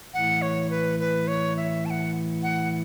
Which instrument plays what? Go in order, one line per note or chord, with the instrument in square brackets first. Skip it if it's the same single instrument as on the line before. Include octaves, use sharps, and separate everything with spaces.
[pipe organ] A2 E3 A3 E4 [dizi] F#5
[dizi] C#5
B4
B4
C#5
E5
A5
F#5
F#5